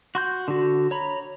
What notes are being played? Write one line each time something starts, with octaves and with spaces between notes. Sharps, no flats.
F#4 C6 G6
D3 F#4
C#5 A#5 B5